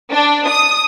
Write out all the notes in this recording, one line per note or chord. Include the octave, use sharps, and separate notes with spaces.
D4
D#6